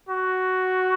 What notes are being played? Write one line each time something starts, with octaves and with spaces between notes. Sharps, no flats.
F#4